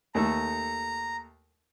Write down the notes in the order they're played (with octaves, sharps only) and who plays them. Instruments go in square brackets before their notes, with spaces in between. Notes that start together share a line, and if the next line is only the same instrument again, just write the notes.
[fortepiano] D#2 A3 A4 [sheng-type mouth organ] A#5